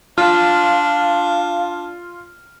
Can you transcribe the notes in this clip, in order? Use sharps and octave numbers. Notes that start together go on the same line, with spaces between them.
D4 F4 F5 F6